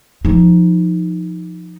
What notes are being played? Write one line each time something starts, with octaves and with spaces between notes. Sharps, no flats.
F3 D#4